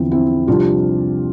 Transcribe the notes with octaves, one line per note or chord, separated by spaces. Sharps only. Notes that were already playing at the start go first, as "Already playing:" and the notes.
Already playing: E2 D3 F3 C4 E4
C4 E4
C2 C3 F3 D4 F4